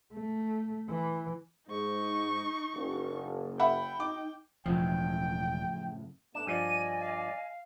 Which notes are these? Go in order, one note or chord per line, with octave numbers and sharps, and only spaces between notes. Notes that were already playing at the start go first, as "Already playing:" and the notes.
A3
E3
G#2 D#4 C#6
F#1
E5 F#5 G5 B5
D#4 D6
E1 F#2 A2 C#3 F3 G5
G#2 A3 B3 D4 E7
G2 F3 D5 D#5 G#5 D#7
F5